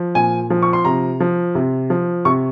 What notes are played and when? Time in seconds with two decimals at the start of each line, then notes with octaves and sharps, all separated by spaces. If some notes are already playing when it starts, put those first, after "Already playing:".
Already playing: F3
0.15 A#2 G#5
0.50 F3
0.63 C#6
0.73 C6
0.85 C3 A#5
1.20 F3
1.55 C3
1.90 F3
2.25 C3 C#6